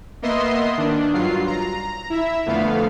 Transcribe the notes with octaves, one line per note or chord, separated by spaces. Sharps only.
A#3 B3 D#5 E5 C6 C7
D#3 D4
G2 F#3 F4 C7
A#5
E4 E5
F2 D3 A3 B3 F5